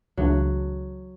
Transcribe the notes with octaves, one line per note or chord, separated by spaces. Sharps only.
C#2 C#3 E3 F#3 A3 D4